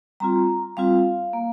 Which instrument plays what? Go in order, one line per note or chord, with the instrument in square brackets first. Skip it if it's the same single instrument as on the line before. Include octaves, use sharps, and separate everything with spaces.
[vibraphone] G3 C4 F4 A#5
G3 C4 F4 F5
A#3